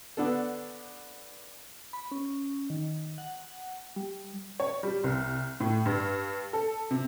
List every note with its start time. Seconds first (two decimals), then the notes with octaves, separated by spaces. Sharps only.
0.17 D3 B3 D4 A4
1.93 B5
2.11 C#4
2.70 D#3
3.18 F#5
3.96 G3
4.60 C#5
4.83 G3
5.04 C2
5.60 A2
5.86 G2
6.53 A4
6.91 C3